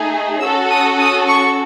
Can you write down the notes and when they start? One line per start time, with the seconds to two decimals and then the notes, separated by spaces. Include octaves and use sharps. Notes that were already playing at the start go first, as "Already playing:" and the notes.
Already playing: A3 D#4 G#4
0.42 C#4 F#4 A4 E6
0.71 D#6
0.99 D#6
1.28 C#6